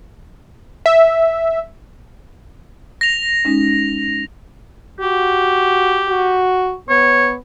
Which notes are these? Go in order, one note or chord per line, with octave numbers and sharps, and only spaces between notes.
E5
A#6 F7
G#3 C#4 D#4
F#4 G4
F#4
B3 C#5